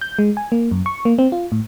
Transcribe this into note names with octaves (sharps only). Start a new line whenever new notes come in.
G6
G#3
G#5
A#3
F#2
C#6
A#3
C4
F4
A2